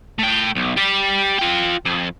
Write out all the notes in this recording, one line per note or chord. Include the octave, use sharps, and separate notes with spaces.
A3 G5
B1
G4 D5
F4 G5
F2